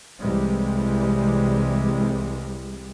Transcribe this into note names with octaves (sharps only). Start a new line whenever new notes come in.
C2 C3 E3 G3 G#3